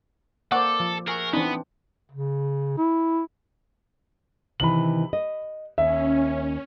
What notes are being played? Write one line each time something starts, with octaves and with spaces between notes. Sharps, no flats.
A#3 A4 C5 D5 F#5 C#6 F#6
F3
A3 F#4 G#4 A#4
E3 B3 C4 D4 D#4
C#3
E4
C3 D#3 E3 B5 F#7
D#5
D#2 C#4 E5